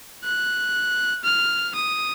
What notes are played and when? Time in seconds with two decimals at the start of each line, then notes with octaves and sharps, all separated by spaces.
0.24 F#6
1.24 F6
1.75 D#6